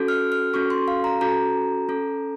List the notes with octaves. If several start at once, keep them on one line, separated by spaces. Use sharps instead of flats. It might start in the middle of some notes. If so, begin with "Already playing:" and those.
Already playing: C#4 F#4 A4
F6
F6
C#4 F#4 A4 C#6
C6
F5
A#5
C#4 F#4 A4 A#5
C#4 A4